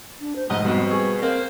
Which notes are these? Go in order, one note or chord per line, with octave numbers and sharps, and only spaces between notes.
D4
C5
F1 B1 G#2 A3 D#5
B2 G3 B3 C4
G#4 C#6
A#3 C4 A#4 C5